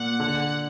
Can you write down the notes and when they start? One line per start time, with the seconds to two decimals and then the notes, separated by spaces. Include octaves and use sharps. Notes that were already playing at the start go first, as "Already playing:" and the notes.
Already playing: A#2 F#5
0.20 D3